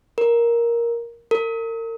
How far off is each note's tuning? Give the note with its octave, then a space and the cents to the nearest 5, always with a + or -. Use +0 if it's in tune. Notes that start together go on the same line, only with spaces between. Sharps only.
A#4 +5
A#4 -35